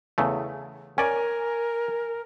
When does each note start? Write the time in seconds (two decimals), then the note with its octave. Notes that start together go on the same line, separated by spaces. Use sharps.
0.18 E2 C#3 A3
0.98 C#4 A#4 D5 G#5